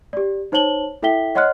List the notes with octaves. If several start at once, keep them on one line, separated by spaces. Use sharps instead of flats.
G4 D5
D#4 C5 C#5 A5 F#7 G7
E4 A4 E5 G5 B6 G7
C#5 D#5 F#5 C6 F6 F#6